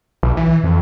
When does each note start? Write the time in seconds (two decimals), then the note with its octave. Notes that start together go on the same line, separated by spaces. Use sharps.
0.23 B1
0.37 E3
0.64 F2